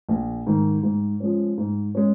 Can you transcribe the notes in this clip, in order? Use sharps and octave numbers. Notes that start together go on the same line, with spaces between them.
A#1
G#2 D#3
G#2
F3 G#3 C#4
G#2
G#3 C#4